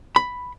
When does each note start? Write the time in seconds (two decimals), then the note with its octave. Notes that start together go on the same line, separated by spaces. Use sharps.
0.16 B5